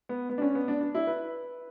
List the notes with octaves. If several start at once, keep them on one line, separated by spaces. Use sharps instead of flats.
B3
B3
D4
C#4
B3
D4
D4
E4
B4